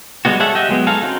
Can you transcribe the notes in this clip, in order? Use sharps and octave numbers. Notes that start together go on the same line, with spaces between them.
G3 G#3 B3 F#4
G#4 A4 C#5 E5 F#5
G4 D#5 E5
F#3 G#3 B3
D#4 G#4 A4 F5
C4 C#4 D#4 F#4